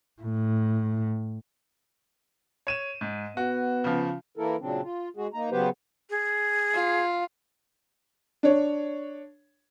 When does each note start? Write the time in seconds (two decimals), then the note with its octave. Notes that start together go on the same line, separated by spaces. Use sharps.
0.22 A2
2.67 C#5 D#7 E7
3.01 G#2
3.37 B3 F#4
3.84 C#3 F3
4.37 E3 A#3 E4 A4 A#4
4.60 A#2 C#3 F#3 C4 D4
4.82 F4
5.17 G#3 F#4 G#4
5.34 A#3 D#4 A#5
5.51 C#3 F#3 B3 G4 B4 C5
6.10 G#4
6.74 F4
8.43 D4 C#5